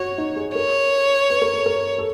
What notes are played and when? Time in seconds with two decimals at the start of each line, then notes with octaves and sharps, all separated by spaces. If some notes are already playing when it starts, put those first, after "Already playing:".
Already playing: F#4 C#5
0.18 D#4
0.36 G#4
0.55 A#4 C#5
1.30 B4
1.42 A#4
1.54 A4
1.66 A#4
1.98 A4